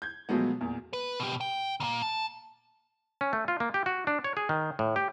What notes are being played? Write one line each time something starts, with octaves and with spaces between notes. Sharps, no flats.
G6 G#6
B2 F3 F#3 G#3 A3 B3
E2 A#2
B4
B2 G4
G5
D#2 A#2
A5
C#4
A3
F4
A#3
G4
F#4
D4
C#5
G#4
D#3
A2
G4